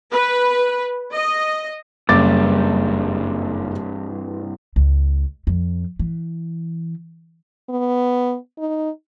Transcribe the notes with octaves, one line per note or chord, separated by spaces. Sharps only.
B4
D#5
F#1 C2 G2 D6 A6
C#2
F2
E3
B3
D#4